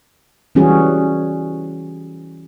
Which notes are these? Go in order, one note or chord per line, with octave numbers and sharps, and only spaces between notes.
E3 G3 C#4 F#4 G#4